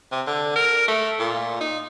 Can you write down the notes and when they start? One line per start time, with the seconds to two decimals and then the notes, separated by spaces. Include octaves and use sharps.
0.12 C3
0.27 D3
0.56 A#4
0.88 A3
1.19 A#2
1.61 D#4